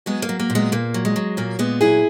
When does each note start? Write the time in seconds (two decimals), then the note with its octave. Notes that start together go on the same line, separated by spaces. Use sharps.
0.06 F#3 G#3 B3
0.22 A#3
0.29 F#3
0.39 A#3
0.50 A#2
0.55 G#3 B3
0.72 A#2 A#3
0.94 F#3
1.05 G#3
1.16 F#3
1.37 A#2 A#3
1.59 A#2 G#3 B3
1.81 F#3 E4 G#4